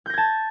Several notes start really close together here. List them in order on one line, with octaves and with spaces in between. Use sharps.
G6 A#6 G#6 A5